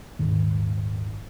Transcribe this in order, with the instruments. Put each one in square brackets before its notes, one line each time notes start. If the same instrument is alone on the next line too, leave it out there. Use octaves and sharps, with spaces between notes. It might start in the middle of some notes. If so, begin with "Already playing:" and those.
[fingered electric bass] D#1 G#1 G#2 D#3